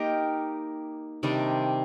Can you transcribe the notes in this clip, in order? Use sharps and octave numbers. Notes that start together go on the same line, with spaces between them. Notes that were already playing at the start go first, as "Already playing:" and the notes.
Already playing: A#3 D#4 G4 A#4
C3 D#3 G3 D4